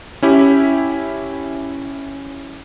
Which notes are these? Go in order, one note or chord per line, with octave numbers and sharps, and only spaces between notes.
C#4 E4 G4